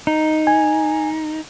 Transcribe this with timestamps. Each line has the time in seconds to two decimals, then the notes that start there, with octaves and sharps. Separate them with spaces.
0.07 D#4
0.47 G#5